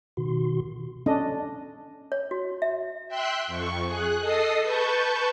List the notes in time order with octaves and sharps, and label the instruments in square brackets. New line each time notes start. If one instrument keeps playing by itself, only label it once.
[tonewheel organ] B2 D#3 F#4 C6
[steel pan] C#4 D4 A4 D#5
[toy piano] C#5
F#4
E5
[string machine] E5 G5 C6 F#6 G6
F2 C#6
G#4 F#6
A4 D#5 D#6 C7
B4 A5 C#6 G6